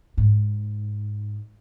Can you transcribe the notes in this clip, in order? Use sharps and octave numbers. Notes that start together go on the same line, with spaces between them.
G#2